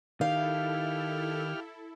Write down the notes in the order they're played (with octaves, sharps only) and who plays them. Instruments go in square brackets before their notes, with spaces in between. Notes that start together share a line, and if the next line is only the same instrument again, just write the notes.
[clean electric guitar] D#3 [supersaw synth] E4 A4 [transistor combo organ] G4 F6 [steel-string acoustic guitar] F5